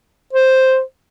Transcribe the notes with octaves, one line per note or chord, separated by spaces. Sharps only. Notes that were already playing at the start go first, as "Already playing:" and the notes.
C5